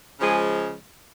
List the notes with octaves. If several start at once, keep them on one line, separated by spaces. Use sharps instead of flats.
C#3 F3 G#3 G#4